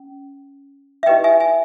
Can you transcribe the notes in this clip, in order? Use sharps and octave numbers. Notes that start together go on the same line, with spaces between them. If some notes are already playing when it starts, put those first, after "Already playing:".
Already playing: C#4
E5
E4 G4 B4 D#5 G5
E5 G#5
E5 G#5